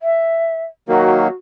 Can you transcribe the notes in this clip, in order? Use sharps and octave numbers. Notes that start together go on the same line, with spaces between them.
E5
D#3 F#3 A#3 F#4